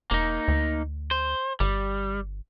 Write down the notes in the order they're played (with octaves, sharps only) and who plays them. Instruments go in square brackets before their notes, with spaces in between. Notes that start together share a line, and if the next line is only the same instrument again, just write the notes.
[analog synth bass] E1 [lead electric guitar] A#3 D#4
[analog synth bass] D2
[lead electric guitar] C5
[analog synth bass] G1 [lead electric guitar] G3